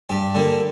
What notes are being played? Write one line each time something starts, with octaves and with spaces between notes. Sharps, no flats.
G2 G4
D3 G3 A#3